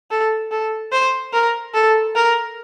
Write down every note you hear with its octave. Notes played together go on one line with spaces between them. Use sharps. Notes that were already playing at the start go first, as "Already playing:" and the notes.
A4
A4
C5
A#4
A4
A#4